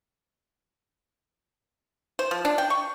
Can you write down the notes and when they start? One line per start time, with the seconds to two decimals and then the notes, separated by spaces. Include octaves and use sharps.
2.19 C5
2.31 F3
2.45 D4
2.58 G5
2.70 C#6